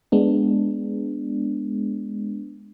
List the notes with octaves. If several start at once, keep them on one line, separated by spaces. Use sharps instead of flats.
G#3 B3 D4